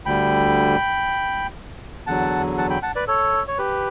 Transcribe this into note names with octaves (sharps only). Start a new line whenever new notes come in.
D2 D3 G3 G5 B5
E2 D3 F#3 F#5 A5
F#5 A5
G5 B5
F#5 A5
B4 D5
A4 C#5
C#5
G4 B4